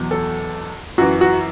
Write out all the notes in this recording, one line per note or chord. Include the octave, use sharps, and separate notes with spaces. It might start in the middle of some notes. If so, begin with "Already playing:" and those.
Already playing: E2 B2 F#3
A4
F#2 E3 F#4
F#4